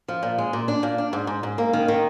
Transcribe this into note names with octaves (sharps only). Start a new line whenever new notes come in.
F3
A#2
G#3
A#2
D4
A#2
D4
G#2
G#2
G#2
A#3
D#3
D#3